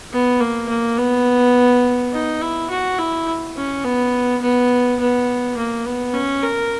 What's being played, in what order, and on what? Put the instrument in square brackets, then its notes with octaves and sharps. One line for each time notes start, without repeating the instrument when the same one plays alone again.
[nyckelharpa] B3
A#3
A#3
B3
D#4
E4
F#4
E4
C#4
B3
B3
B3
A#3
B3
C#4
A#4